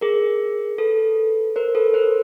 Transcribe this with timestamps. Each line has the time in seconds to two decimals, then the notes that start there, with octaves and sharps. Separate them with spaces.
0.01 G#4 A#4
0.78 A4 B4
1.56 A#4 C5
1.75 A4 B4
1.94 A#4 C5